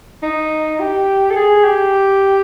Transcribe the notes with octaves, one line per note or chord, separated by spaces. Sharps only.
D#4
G4
A4
G#4
G4